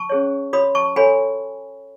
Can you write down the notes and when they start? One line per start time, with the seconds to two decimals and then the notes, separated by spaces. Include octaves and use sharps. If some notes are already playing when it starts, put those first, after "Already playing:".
Already playing: A5 C#6
0.09 C#4 G#4 C#5
0.53 F#4 C#5 B5 D#6
0.75 A5 C#6
0.96 F#4 A4 C#5 G#5 B5